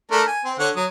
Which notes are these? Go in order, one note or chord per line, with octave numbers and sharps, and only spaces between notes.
A3 D4 A#4
G#5
C4
D3 C#5 F#5
F#3 D#6